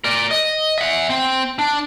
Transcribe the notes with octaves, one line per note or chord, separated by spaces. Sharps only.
A#4 D5
D#5
E5 F#5
C4
D4